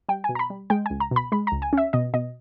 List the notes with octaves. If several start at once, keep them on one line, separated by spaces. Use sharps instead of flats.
G3 G5
B2 G#5
A#5
B5
G3
G#3 G5
C#2 G#5
A#5
B2 B5
G#3 B5
C#2 A#5
G#5
C#4 E5
B2 D#5
B2 D#5